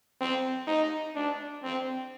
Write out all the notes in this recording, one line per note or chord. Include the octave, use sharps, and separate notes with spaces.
C4
D#4
D4
C4